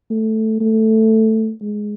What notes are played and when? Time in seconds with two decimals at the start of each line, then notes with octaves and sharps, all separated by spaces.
0.10 A3
0.60 A3
1.61 G#3